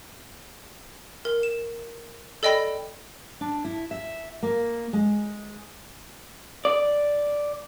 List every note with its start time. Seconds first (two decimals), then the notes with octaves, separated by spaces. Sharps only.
1.25 A#4
1.43 E7
2.43 A4 D5 D#5 G5 B5
3.41 D4
3.65 E4
3.91 E5
4.43 A#3
4.93 G#3
6.65 D5